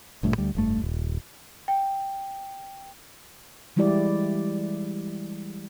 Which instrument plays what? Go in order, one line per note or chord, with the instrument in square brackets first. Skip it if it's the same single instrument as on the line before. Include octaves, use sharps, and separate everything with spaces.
[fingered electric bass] A1 G2 A#2 A3
D2 G3
F1 G2 A3
D#1
[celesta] G5
[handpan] E3 G3 G#3 E4 G4 D5